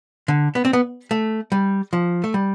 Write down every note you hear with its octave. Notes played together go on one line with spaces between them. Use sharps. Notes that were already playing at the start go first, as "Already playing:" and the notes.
D3
B3
C4
B3
A3
G3
F3
A3
G3